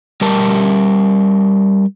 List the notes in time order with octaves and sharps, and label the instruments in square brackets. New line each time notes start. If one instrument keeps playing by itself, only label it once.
[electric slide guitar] G3 G4 A#4 A5